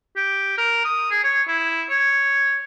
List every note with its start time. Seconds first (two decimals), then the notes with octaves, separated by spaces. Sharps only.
0.17 G4
0.58 A#4
0.85 D#6
1.11 G#4
1.24 C#5
1.48 E4
1.89 C#5